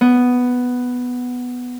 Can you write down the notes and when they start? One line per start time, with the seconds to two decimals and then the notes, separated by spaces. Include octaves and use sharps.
0.01 B3